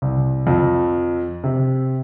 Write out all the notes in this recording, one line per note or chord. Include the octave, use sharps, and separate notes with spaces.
C2
F2
C3